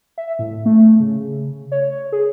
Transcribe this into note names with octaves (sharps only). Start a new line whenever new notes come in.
E5
A2
A3
C#3
C#5
G#4